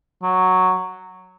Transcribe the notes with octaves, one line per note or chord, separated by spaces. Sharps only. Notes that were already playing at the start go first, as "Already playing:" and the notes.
F#3